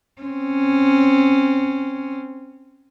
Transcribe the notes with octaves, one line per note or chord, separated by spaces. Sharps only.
C4 C#4